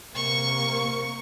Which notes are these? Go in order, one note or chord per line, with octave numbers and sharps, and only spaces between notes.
C3 A#3 C#6